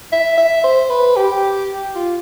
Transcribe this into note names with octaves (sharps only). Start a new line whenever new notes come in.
E5
E5
C5
B4
G4
F4